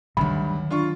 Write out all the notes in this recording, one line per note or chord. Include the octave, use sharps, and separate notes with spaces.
D2 G2 D#3 F#3 B5
D4 F4 C#6